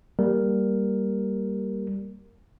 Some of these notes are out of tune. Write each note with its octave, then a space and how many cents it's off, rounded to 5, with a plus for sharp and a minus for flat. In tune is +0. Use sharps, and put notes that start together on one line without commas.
G3 +0 A#3 +0 A#4 +0